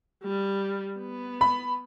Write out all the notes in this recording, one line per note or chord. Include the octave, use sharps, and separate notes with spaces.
G3
B3
B5